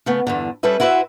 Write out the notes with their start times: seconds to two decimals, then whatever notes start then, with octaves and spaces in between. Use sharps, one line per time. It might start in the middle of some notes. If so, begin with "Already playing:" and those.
0.06 C#3 A3 B3
0.27 E2 G2 D3
0.63 G3 C#4 A4 B4 E5
0.80 E4 F#4 B4 C5 D5 E5